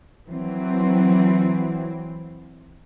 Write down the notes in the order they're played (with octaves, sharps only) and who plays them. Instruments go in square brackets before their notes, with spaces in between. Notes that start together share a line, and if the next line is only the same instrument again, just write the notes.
[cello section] E3 F#3 C4